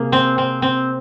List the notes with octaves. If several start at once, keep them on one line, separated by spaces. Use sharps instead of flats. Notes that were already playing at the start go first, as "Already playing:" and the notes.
Already playing: C3 A#3 G#4
C4
C4
C4